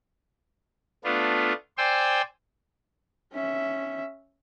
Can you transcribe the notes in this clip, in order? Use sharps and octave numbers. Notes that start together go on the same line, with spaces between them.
A3 B3 D4 F4
C5 D5 G5 G#5 C6 E6
C#4 E5